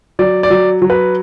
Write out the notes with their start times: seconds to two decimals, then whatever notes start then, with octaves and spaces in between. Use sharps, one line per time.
0.19 F#3 D5
0.43 D5
0.50 F#3
0.82 F#3
0.90 B4